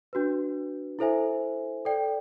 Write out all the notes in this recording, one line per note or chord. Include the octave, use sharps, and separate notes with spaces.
D4 F#4 B4
E4 A4 C5 E5 G#5
A4 D5 G5